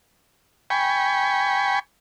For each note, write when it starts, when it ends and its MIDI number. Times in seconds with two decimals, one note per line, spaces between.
0.70 1.79 79
0.70 1.79 80
0.70 1.79 83
0.70 1.79 85